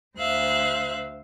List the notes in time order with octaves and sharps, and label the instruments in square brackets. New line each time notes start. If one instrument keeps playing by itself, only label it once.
[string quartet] D2 C5 E5 F5 F#6